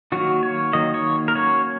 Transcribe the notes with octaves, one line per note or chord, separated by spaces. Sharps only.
D#3 F#3 A#3 F#4
C#5
D#3 F#3 A#3 D#5
C#5
A#4
F#3 A#3 C#4 C#5